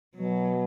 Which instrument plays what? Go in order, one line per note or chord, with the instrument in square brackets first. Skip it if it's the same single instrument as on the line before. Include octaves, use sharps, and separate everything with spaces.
[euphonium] B2 [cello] F#3